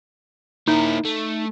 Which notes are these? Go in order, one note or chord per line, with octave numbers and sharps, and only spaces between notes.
A#3 D#4 E4
A3